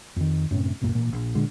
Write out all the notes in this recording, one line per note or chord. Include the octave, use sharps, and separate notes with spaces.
F2 D#3
F#2 A2 C3 C#4
C2 F#2 A#2 A#3
A1 A#2 A#3
A#1
A#2 D3 G#3